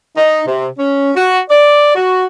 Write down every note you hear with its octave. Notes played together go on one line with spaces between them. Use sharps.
D#4
C3
C#4
F#4
D5
F#4